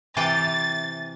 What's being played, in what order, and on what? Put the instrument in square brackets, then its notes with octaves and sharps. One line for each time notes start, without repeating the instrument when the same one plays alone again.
[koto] C3 E3 G5 [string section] A6